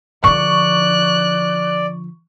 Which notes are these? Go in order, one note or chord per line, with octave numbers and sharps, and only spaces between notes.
D3 F3 D5 C#6 F#6